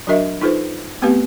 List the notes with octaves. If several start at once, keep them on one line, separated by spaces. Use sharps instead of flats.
F#3 D4 F#4 A#4 D#5 E5
D#4 F4 A4 B4 C5
A3 B3 C4 G4 B4 F5